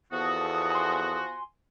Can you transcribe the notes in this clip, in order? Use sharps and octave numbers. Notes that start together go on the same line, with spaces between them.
E2 F3 B3 F#4 A4 D#6
G#5 C6